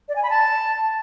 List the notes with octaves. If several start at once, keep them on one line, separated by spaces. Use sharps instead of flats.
D5
G#5
B5
A5